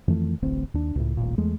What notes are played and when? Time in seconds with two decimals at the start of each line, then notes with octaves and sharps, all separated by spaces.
0.08 F2 D#3 E3 A3
0.42 D1 A1 D2 C4
0.74 D#2 D4
0.95 C#2 A2
1.17 D#1 A1 A#2
1.38 E2 G#3 A3